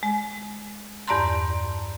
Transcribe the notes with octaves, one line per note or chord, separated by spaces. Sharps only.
G#3
E2 G2 D5 A5 A#5 C6